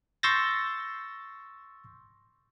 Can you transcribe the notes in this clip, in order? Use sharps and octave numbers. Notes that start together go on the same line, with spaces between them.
C6 C#6 E6 G6 A6 A#6